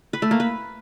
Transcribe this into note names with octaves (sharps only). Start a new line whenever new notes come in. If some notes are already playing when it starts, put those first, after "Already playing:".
B4
A3
A#3
B4